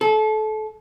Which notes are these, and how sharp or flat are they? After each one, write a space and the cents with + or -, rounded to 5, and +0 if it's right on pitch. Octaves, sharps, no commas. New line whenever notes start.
A4 -30